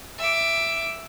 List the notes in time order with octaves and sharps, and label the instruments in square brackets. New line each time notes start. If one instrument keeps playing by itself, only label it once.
[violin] E5 D6